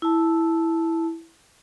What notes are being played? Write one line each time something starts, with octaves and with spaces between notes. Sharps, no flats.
E4 A5